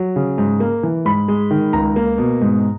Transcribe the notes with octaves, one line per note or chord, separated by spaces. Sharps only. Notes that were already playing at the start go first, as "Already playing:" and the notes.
Already playing: F#3
C#3
G#2
A#3
E3
G#2 B5
G#3
D#3
C#2 A#5
A#3
B2
G#2